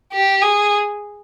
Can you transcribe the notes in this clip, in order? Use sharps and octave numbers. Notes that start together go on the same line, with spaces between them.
G4
G#4